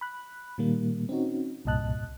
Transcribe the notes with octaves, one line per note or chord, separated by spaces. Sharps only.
B5 F#6
A#2 D#3 G3 A#3
C4 C#4 D#4 F#4
C2 G2 A#2 D#5 A5 F#6